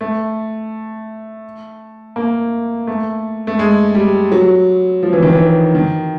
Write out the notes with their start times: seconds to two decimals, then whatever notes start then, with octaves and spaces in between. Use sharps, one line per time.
0.01 A3
2.16 A#3
2.87 A3
3.47 A3
3.59 G#3
3.95 G3
4.32 F#3
5.03 F3
5.13 E3
5.23 D#3
5.33 E3
5.75 D#3